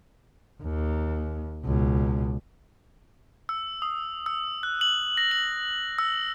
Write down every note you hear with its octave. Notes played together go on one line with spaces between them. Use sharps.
D#2
C#2 B2
E6
D#6
E6
F#6
F#7
A#6
F#7
E6